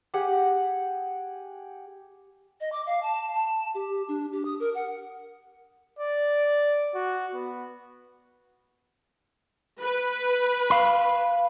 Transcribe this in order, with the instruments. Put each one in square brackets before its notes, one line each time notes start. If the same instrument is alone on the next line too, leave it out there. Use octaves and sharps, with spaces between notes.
[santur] G4 G#4 F#5
[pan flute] D#5
D6
F5
A5
A5
G4
D4
G4
D#6
A#4
F#5
[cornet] D5
F#4
B3
[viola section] B4
[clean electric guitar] F5 B5